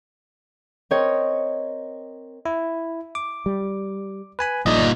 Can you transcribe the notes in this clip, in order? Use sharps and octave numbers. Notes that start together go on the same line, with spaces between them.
C4 A#4 C#5 D#5
E4
D6
G3
B4 G#5 B5
A#1 A#2 D#4 D5 D#5
G1